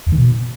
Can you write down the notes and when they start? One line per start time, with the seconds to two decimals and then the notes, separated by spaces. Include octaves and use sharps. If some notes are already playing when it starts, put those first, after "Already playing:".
0.07 E2
0.12 D#3
0.18 B2